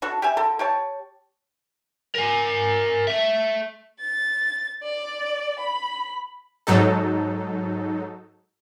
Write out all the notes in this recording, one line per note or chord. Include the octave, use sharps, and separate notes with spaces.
D4 F#4 A4
G4 D5 E5 G#5
D3 A4
G4 C#5 A5
A#4 G#5
A3 E5
A6
D5
B5
G#2 F#3 D#4 A4